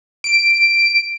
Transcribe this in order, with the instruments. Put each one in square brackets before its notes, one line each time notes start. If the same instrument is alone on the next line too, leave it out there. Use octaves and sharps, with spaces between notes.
[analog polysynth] D7